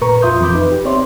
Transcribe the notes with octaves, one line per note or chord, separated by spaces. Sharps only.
A#2 A#4 B4 A#5 C#6
F2 F4 E5 C6 D#6 G6
F2 E3 B5 D6 G6
D#4 B4
G4
C4 C#5 D5 E5 C6